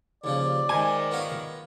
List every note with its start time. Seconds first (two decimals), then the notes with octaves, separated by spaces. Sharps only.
0.24 D#2 C#3 F3 D5
0.69 D#3 G#3 C5 G#5
1.12 B3 F4 C#5